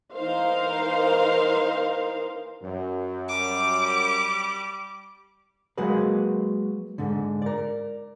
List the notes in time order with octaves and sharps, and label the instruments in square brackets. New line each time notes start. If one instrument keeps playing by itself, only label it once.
[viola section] E3 D#4 A#4 C5 F5
[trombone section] F#2
[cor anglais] G3 [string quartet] D6
[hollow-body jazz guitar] F#3 G#3 A#3 F#4 G#4 B4
G#2 D3
A#4 D5